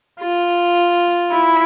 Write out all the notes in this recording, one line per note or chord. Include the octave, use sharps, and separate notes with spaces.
F4
E4